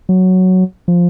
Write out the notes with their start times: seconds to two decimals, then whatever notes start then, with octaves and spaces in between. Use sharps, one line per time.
0.09 F#3
0.88 F3